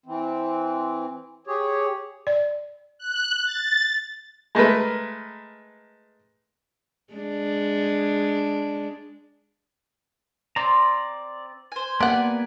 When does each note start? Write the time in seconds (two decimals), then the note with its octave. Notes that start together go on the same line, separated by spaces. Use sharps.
0.06 E3 C4
1.47 G4 G#4 C#5
2.27 D5
2.99 F#6
3.45 A6
4.55 G#3 A3 A#4 B4
7.14 G#3 D4
10.56 C4 D5 A#5
11.72 C5 G#5
12.00 G3 A#3 B3 D5 F#5 G#5